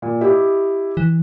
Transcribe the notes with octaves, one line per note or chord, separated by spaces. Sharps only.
A#2
E4 G4 D#5
E3